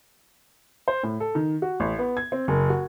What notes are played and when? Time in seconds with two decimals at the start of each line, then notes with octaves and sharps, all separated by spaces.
0.88 C5
1.03 A2
1.20 A4
1.35 D#3
1.62 F#4
1.80 A1
1.99 B3
2.17 G#6
2.32 C4
2.48 F#1
2.70 F#4